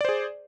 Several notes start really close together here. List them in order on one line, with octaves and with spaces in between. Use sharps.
D5 C5 G#4